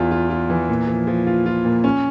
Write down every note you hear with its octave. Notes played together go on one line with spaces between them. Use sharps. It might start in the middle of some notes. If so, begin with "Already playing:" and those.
Already playing: E2 E3 F4
F4
F4
E3
A#2
F3
F3
F4
F4
A#2
C#4